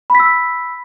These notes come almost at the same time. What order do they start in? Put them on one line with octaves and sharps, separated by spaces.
B5 B6 E6